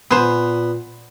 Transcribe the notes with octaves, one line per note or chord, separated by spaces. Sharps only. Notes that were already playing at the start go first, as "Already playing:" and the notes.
A#2 B3 C5 G#5